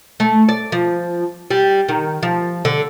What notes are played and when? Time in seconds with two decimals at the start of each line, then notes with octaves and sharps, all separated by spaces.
0.20 A3
0.49 D5
0.72 F3
1.51 G3
1.89 D#3
2.23 F3
2.65 D3